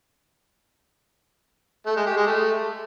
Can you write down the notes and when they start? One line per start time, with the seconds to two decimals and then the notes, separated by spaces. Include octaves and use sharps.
1.86 A3
1.96 G#3
2.07 G4
2.17 G#3
2.27 A3